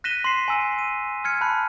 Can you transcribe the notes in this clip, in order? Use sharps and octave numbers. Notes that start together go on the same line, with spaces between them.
F#6 A#6 B6 D#7 E7 G7
C6 B6 C7
G#5 A#5 E6 C#7 D#7
D#7
F6 G#6 C#7
A5 B5 F#6